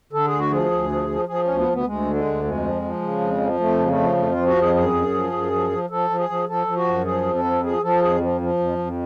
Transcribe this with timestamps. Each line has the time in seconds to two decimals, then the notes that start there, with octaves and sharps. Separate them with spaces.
0.13 D3 A4
0.27 G#4
0.33 D2
0.39 F#4
0.51 F3 G#4
0.72 D2
0.90 F3
1.09 F3
1.28 F3 G#4
1.44 D2 C#4
1.57 B3
1.68 D2 B3
1.86 D2 G#3
2.05 D3
2.16 G#3
2.25 D2
2.44 F2 G#3
2.63 F3
2.82 F3
3.01 C#3
3.21 F2
3.41 F3
3.60 F2 A3
3.79 C#3 G#3
3.89 A3
3.99 F3
4.17 F2 A3
4.31 F4
4.37 F3
4.46 F#4
4.56 F2 G#4
4.75 F#2 G#4
4.94 F#2
5.14 F3
5.33 F#2
5.53 F3
5.71 F3
5.90 F3 A4
6.10 F3
6.19 G#4
6.29 F3
6.48 F3 A4
6.67 F3
6.77 F#4
6.87 F#2
7.06 F3 G#4
7.26 F2
7.35 A4
7.44 F3
7.64 F3 G#4
7.82 F3 A4
8.02 F2 G#4
8.21 F3
8.41 F3
8.59 F2
8.78 F2